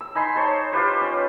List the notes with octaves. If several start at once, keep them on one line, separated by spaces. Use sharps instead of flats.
E6
D#4 G#5 B5 C6
A4 C5 C#5
F4 G4 B4 C5
C#4